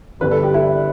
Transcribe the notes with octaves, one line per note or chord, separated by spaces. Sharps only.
G1 G2 E3 G3 B4
A4
G4
E4 A4